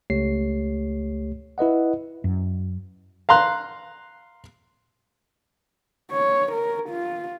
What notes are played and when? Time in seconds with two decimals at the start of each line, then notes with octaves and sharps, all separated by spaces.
0.10 C#2 A3 G4 C#5 C7
1.58 E4 B4 D#5 F#5
2.24 F#2
3.29 F5 A#5 C6 F#6
6.11 C#5
6.52 A#4
6.90 F4